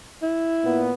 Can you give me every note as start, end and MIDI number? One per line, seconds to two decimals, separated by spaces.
0.23 0.88 64
0.65 0.93 46
0.65 0.93 59